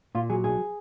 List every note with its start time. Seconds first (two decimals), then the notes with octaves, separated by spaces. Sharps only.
0.15 A#2 F4
0.30 F#3 G#4
0.44 B1 G#4